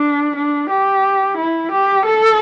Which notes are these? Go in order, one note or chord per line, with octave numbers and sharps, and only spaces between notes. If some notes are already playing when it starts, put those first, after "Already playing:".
Already playing: D4
D4
G4
E4
G4
A4